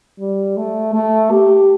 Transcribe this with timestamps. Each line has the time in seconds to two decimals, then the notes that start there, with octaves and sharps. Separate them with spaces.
0.19 G3
0.57 A3
0.93 A3
1.31 G4